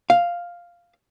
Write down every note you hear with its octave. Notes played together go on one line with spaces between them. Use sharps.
F5